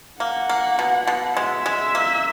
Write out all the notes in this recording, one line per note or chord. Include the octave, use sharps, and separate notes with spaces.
A#3 F#5
A#3
B2
B2
G#3 E5
G#3
A#3